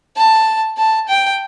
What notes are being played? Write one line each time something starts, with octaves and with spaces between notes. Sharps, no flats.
A5
A5
G5